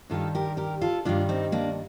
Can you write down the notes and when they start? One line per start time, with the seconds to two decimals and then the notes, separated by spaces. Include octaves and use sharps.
0.10 G2 D#3 G3 F4 A4
0.35 G4 A#4
0.57 G4 A#4
0.81 F4 A4
1.05 G2 D#3 G3 D4 F4
1.29 C4 D#4
1.52 A#3 D4